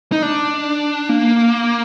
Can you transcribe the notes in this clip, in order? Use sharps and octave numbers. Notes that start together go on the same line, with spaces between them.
D#4
D4
A#3